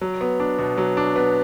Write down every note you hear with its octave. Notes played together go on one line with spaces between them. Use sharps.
F#3
B3
D4
B2
F#3
D4
B3